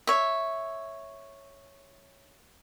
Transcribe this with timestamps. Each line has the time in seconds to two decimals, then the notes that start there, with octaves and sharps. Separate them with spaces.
0.07 C#5 E5